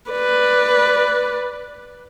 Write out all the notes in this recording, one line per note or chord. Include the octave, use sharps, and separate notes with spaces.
B4 D5